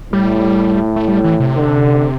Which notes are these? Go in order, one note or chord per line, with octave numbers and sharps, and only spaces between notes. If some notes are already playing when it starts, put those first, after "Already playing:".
A2 G3
A3
G3
E3
C3
D3